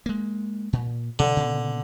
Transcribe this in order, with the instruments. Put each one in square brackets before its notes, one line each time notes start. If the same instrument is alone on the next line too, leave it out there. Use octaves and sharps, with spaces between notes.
[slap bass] G#3 A#3
A#2
[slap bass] B2 [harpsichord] D3
[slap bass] A#2 C#3 B3